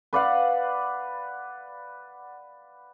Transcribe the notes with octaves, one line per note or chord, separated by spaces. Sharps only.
B4 D5 F5 F#5